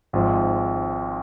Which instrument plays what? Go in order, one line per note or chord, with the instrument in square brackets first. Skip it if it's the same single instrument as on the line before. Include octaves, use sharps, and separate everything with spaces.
[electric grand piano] G#1 G#2 F3